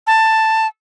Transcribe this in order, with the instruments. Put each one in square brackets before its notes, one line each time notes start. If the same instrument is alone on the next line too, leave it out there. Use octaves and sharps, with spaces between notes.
[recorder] A5